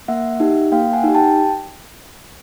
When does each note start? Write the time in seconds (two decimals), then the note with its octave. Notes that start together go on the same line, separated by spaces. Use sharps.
0.08 A#3 E5 F#5
0.40 D#4 G4
0.72 A#3 F5 G5
0.93 F#5 G#5
1.04 D#4 G4
1.15 G5 A5